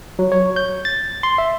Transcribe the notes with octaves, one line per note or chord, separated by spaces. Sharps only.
F#3
C#5
G6
A6
C6
E5